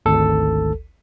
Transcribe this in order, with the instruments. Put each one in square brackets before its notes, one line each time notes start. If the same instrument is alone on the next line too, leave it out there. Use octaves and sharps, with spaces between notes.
[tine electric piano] G#1 D2 A4